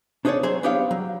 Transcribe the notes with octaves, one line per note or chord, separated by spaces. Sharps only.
D4 D#4 G#4 B4 C#5 D5
F#3 G#4 C5 C#5
B3 D4 G4 C#5 F5
F#3